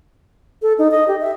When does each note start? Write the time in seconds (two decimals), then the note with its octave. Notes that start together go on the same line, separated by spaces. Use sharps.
0.62 A4
0.79 D#4
0.91 D#5
1.08 G4
1.21 E5